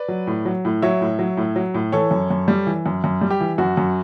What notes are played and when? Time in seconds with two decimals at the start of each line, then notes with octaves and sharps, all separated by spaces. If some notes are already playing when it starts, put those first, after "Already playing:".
Already playing: B4 D5
0.08 F#3
0.27 A2
0.45 F#3
0.65 A2
0.82 F#3 C#5 E5
1.01 A2
1.19 F#3
1.37 A2
1.56 F#3
1.74 A2
1.92 E3 A4 C#5
2.11 F#2
2.30 F#2
2.48 G3
2.67 E3
2.86 F#2
3.04 F#2
3.21 G3
3.30 G4
3.40 E3
3.58 F#2 F#4
3.77 F#2